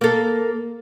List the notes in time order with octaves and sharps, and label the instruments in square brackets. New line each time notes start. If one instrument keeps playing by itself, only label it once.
[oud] A#3 A4